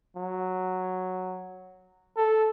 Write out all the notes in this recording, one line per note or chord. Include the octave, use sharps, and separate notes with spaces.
F#3
A4